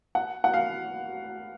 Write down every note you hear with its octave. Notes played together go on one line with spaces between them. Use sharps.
F#5
F#5
F5